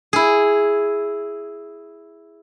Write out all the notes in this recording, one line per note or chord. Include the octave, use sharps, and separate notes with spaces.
E4 G#4